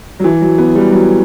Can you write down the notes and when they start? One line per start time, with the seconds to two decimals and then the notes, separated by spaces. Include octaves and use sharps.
0.20 F#3
0.24 E3
0.41 F#3
0.58 B3
0.75 G3
0.92 F#3